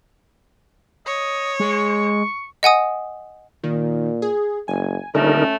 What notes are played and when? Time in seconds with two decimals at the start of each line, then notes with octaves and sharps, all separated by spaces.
1.06 C#5 D#5
1.60 G#3 C#6
2.63 D#5 F#5 G#5 D#6
3.63 A#2 D#3
4.22 G#4
4.68 F#1 G#5
5.15 D#1 D3 A3 C#4 D#4 A#4